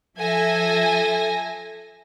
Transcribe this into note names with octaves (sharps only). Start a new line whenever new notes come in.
F3 A4 E5 G#5 A#6